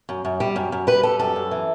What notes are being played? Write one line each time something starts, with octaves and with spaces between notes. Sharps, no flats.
F#2
F#2
G3
F#2
F#2
G3 B4
G3 A4
F#2 A4
F#2
E3